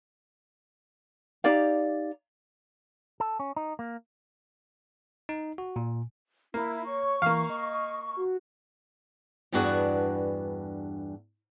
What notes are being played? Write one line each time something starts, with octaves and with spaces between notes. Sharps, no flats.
D#4 G4 D5 F5
A4
C#4
D#4
A#3
D#4
F#4
A#2
A#3 E4
C#5 C#6
E3 A#3 F5
D#5
F#4
E2 G2 B3 D4 F#4 G#4